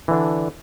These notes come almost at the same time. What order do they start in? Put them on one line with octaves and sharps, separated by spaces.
E3 D3 D4